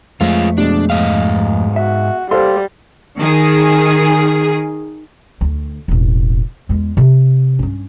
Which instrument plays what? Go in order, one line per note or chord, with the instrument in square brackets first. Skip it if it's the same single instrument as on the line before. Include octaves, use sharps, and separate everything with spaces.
[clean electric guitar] F2 A3 [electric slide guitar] G#3 F4
[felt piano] B2 G#3 [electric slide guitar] D4
[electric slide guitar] G#2 D#5 F5
[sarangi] F#4 [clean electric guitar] E5
[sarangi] G3 [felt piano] A4 C5 F5 [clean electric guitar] C6
[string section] D#3 G#4
[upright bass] D2
E1 A1
E2 G#3
C3
G2 C#4